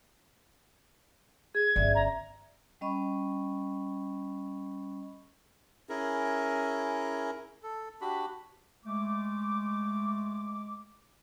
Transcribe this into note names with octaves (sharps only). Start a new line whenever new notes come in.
G#4 G#6
G1 C#4 D5 E5
A#5
G3 C#4 D#5 B5 C#6
C#4 E4 G#4 A#4
A4
D4 F#4 G4 B5
G#3 A3 D6